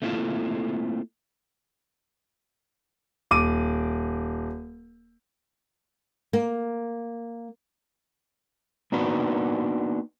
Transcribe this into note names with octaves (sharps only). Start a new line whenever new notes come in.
A3 A#3 C4 E4 F4 A4
D#1 D6 D#7
A#3
A#3 B3 D4 D#4 F#4 B4